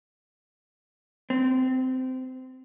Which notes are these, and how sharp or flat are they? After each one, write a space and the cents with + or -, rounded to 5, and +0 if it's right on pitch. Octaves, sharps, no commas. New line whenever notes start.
C4 -20